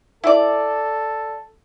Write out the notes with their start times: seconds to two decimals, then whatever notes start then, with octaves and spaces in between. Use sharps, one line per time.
0.24 E4 A4 D5